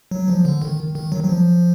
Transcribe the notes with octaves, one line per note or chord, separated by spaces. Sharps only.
F#3
F3
D3
D#3
D#3
F#3
F#3
F3